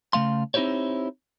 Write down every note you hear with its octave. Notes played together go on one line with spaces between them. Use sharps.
C#3 A3 F5 C6
C4 D#4 E4 G4 C5 C#5